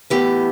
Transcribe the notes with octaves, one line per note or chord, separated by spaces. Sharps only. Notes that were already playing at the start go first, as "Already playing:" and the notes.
A2 E3 B3 G4